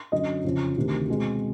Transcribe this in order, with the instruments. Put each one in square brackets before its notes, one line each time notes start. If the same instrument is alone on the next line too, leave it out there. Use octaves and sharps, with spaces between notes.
[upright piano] F#2 D3 F#3 D#5
F2 C#3 F3
D2 C3 D#3
B2 G#3 C4